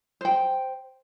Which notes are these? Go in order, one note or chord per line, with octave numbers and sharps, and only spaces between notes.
C5 G5